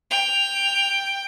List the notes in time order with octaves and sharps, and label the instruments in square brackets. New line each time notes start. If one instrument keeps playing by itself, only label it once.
[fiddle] G5 [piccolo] F7